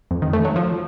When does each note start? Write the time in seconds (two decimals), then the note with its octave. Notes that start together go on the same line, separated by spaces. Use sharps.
0.11 F2
0.22 D#3
0.33 A3
0.45 F#3
0.56 F3